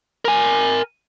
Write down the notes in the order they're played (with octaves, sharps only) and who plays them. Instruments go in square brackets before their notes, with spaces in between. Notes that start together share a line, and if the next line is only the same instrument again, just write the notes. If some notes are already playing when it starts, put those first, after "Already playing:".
[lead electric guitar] A#4 G#5